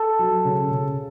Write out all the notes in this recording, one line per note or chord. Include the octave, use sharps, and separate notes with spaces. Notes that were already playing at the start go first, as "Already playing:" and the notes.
Already playing: A4
F#3
C#3
C#3